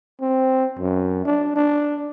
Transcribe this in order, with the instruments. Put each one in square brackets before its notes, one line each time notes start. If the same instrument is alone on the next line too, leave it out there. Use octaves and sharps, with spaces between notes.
[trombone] C4
F#2
D4
D4